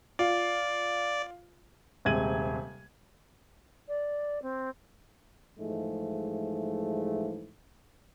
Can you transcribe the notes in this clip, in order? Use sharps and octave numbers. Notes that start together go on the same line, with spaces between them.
F4 D5
D#1 C3 G#3 G#6 D#7 F#7
D5
C4
G#2 E3 F3 G#3 A3